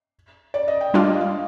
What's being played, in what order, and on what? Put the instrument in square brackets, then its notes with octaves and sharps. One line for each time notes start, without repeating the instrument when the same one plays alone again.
[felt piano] D5
D#5
G5
[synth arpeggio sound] G3 D4 F4 A#4 D5 [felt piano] F5
[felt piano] D#5
F5